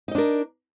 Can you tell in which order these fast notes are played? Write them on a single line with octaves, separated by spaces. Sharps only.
D#4 D#5 D4 A#4